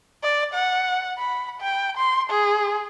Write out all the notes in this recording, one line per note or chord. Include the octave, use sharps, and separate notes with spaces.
D5
F#5
B5
G5
C6
G#4